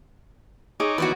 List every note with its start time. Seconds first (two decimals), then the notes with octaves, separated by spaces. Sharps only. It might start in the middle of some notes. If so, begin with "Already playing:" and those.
0.80 D#4 G#4 C#5 D6
0.98 D#3 E3 B3 F#4 C#5 D5